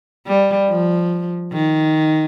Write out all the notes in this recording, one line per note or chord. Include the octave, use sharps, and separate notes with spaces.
G3
F3
D#3